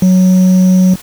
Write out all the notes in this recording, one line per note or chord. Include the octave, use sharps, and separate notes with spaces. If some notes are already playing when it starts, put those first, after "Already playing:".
F#3